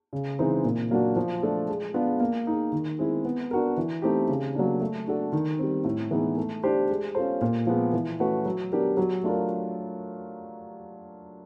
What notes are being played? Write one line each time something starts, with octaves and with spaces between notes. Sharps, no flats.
C#3
E3 G#3 C4 D#4
A#2
F#3 A#3 D4 F#4
F3
A3 D4 F4 A4
G#3
B3 D4 F4 G#4
A#3
D#4 G#4
D#3
G#3 C4 E4
B3
D4 F#4 A#4
E3
A3 C4 D#4 G4
C#3
F#3 A#3 D4
A3
D4 F#4 A4
D#3
G3 C4
A2
E3 G#3 B3 D#4
A3
D4 G4 C5
G#3
C#4 F4 A4 C5
A#2
F3 G#3 B3
E3
A3 C#4 F#4 B4
F#3
B3 D4 G4 A#4
F#3
A3 D4 F4 A#4